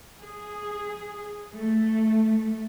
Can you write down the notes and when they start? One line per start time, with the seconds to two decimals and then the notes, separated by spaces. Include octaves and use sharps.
0.22 G#4
1.56 A3